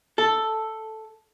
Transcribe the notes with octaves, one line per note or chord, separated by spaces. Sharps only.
A4